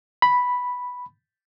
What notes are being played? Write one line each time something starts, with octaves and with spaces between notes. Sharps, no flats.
B5